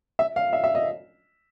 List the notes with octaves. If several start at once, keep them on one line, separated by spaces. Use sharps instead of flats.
E5
F5
E5
E5
D#5